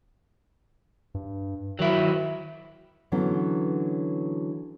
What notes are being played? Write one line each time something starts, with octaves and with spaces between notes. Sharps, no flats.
G2
D#3 F#3 E4
D3 E3 F#3 B3 C#4